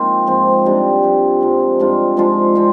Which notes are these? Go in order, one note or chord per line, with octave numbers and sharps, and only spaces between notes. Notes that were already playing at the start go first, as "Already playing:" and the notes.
Already playing: F3 G#3 A#3 C4 D#4 F4
G#2 F3 C4
C3 G3 D4
C3 F3 C4
G#2 F3 G#3
G#2 G3 D4 F4
F3 G#3 D4 F4
F3 C4